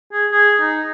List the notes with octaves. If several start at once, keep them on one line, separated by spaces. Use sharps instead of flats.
G#4
G#4
D#4